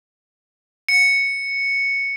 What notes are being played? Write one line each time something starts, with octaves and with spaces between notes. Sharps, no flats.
C#7